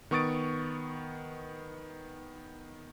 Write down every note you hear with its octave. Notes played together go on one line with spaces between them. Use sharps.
D#3 B3 C#6 D#6 A6 D7